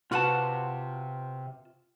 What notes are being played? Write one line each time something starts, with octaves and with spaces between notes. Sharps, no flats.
C3 F4 F#4 B4 F#5 A5